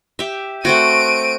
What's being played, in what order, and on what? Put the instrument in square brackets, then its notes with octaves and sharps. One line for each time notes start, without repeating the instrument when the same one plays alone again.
[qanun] G4 E5
[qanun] A3 C4 F#4 [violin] D7 D#7